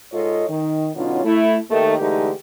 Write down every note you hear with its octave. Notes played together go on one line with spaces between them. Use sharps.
G#2 F4 A4 C#5 D#5
D#3
B2 D3 F#3 C#4 D#4 F4
A3 E4
D#2 D#3 A3
D3 E3 G#3 A3 D#4 G4